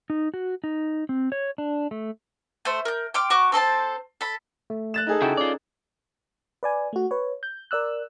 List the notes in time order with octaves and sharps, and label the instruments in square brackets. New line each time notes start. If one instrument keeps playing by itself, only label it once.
[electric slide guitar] D#4
F#4
D#4
C4
C#5
D4
A3
[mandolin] A3 C5
A#4 G6
G5 C6 D6 F6
F#4 C#6 D6
C4 A4 C5 A5
A4 B5
[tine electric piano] A3
[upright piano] F#6 A6 E7
D#4 G#4 A4
[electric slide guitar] C#3 E4 F#4 [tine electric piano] G5 A5
[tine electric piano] C#4 [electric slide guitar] F4 D5
[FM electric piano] B4 D5 G#5
A3 F#4
B4 C#5
G6
A#4 D5 E6 F#6